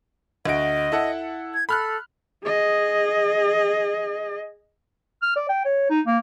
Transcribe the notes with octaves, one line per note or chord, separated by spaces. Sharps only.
D2 F#4 D#5 D7
E4 A4 F#5
G#6
A4 B5 F6 F#6
G#4 D#5
F6
D5
G5
C#5
D#4
A#3